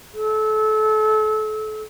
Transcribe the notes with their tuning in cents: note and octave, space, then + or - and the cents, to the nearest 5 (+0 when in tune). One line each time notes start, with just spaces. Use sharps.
A4 -30